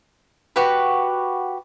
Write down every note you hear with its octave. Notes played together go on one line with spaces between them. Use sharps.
F#4 G4 B4